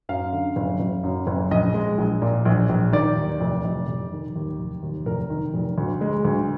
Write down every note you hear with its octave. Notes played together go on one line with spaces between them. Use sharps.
F#2 F5
D3
F#1
F#1
F#2
F#1
A#1 D#5
G#3
A#1
A#2
A#1
A#1
D#3 D5
D#2
F1
F1
F1
D#3
D#2
F1
D#2
F1 A#4
D#3
F1
D2
G#3
D2